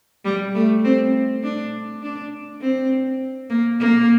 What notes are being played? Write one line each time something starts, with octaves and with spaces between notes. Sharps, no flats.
G3
A3
C4
D4
D4
C4
A#3
A#3